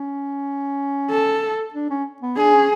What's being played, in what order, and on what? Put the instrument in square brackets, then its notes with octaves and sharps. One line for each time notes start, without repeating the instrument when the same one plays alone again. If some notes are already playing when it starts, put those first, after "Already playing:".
Already playing: [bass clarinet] C#4
[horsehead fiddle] A4
[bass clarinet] D4
C#4
B3
[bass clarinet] D4 [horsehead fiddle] G#4
[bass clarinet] C#4